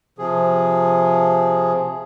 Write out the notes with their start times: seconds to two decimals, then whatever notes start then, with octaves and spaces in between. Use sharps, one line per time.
0.19 C3 F3 G#4